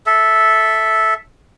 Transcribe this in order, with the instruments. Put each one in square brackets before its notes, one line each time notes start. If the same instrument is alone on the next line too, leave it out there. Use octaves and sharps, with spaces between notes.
[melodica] A4 E5